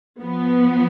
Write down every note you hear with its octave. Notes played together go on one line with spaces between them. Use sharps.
F3 B3